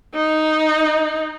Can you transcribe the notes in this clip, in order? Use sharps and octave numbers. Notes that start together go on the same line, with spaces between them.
D#4